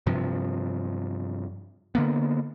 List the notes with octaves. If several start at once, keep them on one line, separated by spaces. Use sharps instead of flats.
G2 C3 F3
D3 A#3 B3